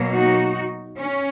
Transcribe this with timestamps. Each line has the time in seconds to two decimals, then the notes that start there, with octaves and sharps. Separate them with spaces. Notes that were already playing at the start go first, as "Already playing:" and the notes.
Already playing: B2 F#3 A#3
0.11 D#4 F#4
1.00 C#4